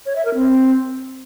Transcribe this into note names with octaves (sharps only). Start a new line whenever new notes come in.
C#5
E5
A#4
C4